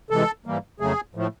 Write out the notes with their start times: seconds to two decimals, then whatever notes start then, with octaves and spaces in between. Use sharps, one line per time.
0.10 C3 E3 G#3 A4
0.46 G#2 E3 G3 A#3
0.80 F2 C#3 F#3 A3 G#4
1.15 A2 F3 A3